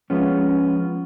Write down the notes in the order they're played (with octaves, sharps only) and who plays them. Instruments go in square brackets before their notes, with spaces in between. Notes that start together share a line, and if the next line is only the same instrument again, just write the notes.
[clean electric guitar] F3 G#3 B3 C#4